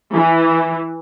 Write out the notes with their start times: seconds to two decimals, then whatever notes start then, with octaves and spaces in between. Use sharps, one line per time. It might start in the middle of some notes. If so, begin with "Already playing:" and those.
0.14 E3